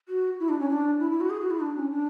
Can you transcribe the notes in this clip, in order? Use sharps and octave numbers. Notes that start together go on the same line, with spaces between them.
F#4
E4
D4
C#4
D4
E4
E4
F#4
G#4
F#4
E4
D4
C#4
D4